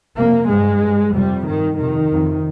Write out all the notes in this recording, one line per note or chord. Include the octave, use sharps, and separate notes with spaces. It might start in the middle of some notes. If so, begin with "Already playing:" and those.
F2 C3 A#3
G2 G#3
G2
F2 C3 G3
G2 D#3
F2 C3 D#3
F2 C3